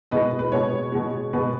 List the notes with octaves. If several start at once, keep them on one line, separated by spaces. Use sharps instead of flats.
B2 G#3 B4 D#5
B4
B2 G#3 C#5
B2 G#3
B2 G#3 B4